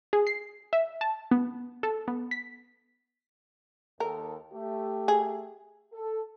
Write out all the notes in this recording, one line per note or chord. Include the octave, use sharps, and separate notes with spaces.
G#4
C7
E5
A5
B3
A4
B3
B6
D#2 A4 A#4
A3 G4
G#4
A4